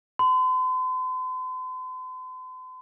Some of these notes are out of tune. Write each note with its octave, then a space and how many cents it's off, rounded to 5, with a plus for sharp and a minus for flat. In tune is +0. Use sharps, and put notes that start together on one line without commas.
C6 -45